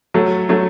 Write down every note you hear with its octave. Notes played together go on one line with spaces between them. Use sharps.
F#3 A3
F#3 A3